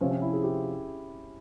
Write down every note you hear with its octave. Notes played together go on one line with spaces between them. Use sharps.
C3 F3 C4 C#4 F4
C#4
E4
G#4
G4